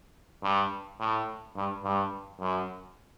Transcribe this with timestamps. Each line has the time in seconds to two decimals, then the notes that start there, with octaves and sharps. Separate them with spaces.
0.43 G2
1.00 A2
1.56 G2
1.83 G2
2.40 F#2